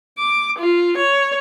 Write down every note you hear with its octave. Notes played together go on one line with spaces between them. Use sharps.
D6
F4
C#5